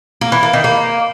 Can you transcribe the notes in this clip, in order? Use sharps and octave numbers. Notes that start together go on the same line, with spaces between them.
A#3
E3
A#3
D#3
A#3